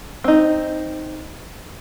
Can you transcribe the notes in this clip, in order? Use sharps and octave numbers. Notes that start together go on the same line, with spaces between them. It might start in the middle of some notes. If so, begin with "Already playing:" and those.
C4 D#4